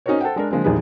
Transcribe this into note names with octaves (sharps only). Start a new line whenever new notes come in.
C#4 D#4 F#4 A#4 C5 C#5
A4 C5 F#5 G5
G#3 D4 A#4
D3 F3 G#3 A#3 C4
A#1 E2 D#3 G3 G#4 B4